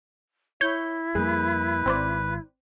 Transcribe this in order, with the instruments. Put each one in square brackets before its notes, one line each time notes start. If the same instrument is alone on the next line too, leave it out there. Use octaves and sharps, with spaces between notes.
[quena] E4 [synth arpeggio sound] C#5 G6
[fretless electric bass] F2 G3 A#3 [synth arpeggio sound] G#4 [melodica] B4
[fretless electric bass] G#1 [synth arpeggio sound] C4 C5 D5